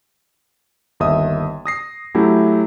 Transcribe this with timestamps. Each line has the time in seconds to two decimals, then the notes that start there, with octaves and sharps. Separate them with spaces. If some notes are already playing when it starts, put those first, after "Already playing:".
1.00 G1 D#2 D#5 E5 D#6
1.66 D#6 A#6 C7
2.15 F#3 A3 C#4 E4 G4